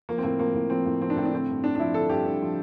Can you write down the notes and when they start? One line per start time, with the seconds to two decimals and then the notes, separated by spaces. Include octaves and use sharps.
0.09 F3 A#3
0.18 C4
0.23 A2 A#3
0.39 F3 A#3
0.54 A2
0.70 F3 C4
0.86 A2
1.01 F3 C4
1.10 D4
1.16 A2 C4
1.25 D4
1.33 D3 C4
1.49 G2
1.64 G2 D4
1.75 D4
1.79 F3 E4
1.94 D3 A4
2.09 G2 G4
2.25 G2
2.42 F3